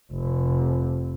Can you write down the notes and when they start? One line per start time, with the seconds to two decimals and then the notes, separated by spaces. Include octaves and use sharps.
0.12 F1